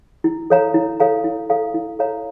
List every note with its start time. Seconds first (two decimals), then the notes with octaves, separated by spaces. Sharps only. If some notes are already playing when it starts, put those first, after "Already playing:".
0.24 E4
0.50 A4 C#5 F5 A#5
0.74 E4
1.00 A4 C#5 F5 A#5
1.24 E4
1.49 A4 C#5 F5 A#5
1.74 E4
1.99 A4 C#5 F5 A#5